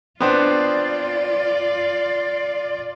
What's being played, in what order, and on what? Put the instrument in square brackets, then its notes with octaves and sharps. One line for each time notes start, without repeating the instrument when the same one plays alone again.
[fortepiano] B3 C4 D4 [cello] F4 D5